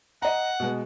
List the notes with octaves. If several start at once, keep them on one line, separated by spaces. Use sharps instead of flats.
D#5 F#5 A#5
B2 G#3 B3